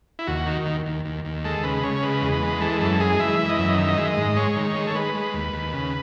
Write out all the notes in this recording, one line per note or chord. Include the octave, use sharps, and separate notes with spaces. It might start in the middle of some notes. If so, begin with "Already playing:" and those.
E4
D#2 F#4
D#3
D#2
D#2
D#2
D#2
G#3 A4
C#3 B4
C#3 C#5
G#3 B4
E2
B4
G#3
E3 A4
F#2 A4
G#3 G#4
E3 E5
E3
D#5
F#2 E5
D#5
D#3 E5
D#5
G#3 E5
D#5
G#2
G#3 C#5
D#3
G#3
A4
G#3 B4
G#3
D#2
D#2
C#3